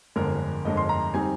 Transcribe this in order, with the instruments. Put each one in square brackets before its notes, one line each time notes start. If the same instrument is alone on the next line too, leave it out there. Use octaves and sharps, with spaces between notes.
[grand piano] G1 F2 D3 G#3 A#4
G1 F2 D3 G#3 D#5
C6
A#5
G3 C4 D#4 G#5